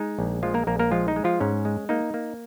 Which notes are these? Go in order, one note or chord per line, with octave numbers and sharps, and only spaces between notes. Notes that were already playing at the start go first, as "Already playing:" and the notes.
Already playing: G#3 D#4
A#1
F3 G#3 F4
A#3 A#4
A#1 A#3 A#4
A#3 A#4
F3 G#3 F4
D#4
G#3
F3 F4
G#2 C#4
G#3
A#3 D#4
A#3